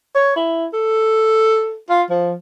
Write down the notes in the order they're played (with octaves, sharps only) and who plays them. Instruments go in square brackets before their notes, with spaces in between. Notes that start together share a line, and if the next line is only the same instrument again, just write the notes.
[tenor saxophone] C#5
E4
A4
F4
F3